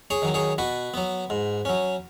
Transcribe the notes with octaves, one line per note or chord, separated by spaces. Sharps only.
G#4 C#5
D#3 F#3
G#4 C#5
B2 F#4 B4
F#3 B3
G#2
F#3 C#4